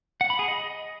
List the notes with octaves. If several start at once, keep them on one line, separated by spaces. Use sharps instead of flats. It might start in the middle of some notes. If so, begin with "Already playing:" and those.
F#5
B5
G#4
D#5